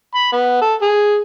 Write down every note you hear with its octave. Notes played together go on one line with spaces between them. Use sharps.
B5
B3
A4
G#4